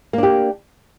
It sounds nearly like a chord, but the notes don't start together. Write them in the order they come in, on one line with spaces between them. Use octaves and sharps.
A#3 D4 G4